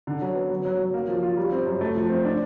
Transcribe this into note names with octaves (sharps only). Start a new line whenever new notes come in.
D3
F#3
B3
F#3
F#3
F#3
A#3
F3
F4
G3
C4
F#2
A3
F3
C4
D4